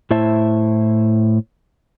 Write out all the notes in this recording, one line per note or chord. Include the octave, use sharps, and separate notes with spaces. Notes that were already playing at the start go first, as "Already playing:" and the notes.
A2 E4 C5 E5 A5